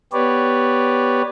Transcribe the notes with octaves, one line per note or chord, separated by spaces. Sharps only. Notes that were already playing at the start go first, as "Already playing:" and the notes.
B3 G4 B4 C#5 D5